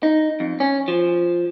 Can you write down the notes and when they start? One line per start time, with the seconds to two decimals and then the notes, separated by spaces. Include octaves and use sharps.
0.03 D#4
0.40 F2
0.60 C#4
0.88 F3